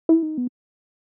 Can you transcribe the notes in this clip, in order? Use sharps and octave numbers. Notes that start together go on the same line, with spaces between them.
E4
D#4
B3